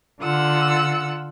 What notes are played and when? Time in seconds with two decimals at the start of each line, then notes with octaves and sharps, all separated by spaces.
0.20 D3 F4 F#5 E6